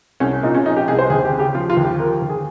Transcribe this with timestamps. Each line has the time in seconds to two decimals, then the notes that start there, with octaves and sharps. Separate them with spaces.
0.20 C2 C#4
0.43 A#2 D#4
0.55 C#4
0.66 F3 D#4
0.76 G4
0.88 C2 G#4
0.99 C5
1.10 D#2 G#4
1.25 G4
1.32 C#3
1.40 G4
1.54 F3 F4
1.70 F4
1.77 D#2
1.85 G4
1.99 F3 A#4
2.22 D#2
2.30 G#4